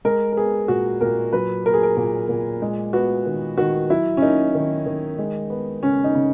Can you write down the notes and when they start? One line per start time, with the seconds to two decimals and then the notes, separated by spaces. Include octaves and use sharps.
0.05 G#3 A#4
0.32 A#4
0.36 B3 G#4
0.68 A#2 F#4
1.01 A#2 A#4
1.33 F#3 B4
1.66 A#3 A#4
1.74 G#4
1.83 A#4
1.97 A#2
2.29 A#2
2.62 G#3
2.93 B3 F#4
3.26 D#3
3.57 D#3 F#4
3.90 F#3 E4
4.17 C#4
4.22 A#3 D#4
4.55 D#3
4.86 D#3
5.19 G#3
5.50 B3
5.83 C#3 C#4
6.04 D#4
6.15 C#3